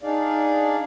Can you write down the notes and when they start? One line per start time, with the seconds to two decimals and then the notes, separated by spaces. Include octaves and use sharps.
0.02 D4 D#4 G#4 D5 F5